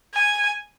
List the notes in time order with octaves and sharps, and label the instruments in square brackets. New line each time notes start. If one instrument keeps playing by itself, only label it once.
[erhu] G#5